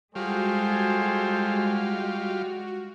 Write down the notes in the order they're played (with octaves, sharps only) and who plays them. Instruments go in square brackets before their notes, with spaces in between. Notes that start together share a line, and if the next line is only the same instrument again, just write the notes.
[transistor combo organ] G3 F4 [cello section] G#3 [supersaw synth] F#4 [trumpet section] G#4 A4 C5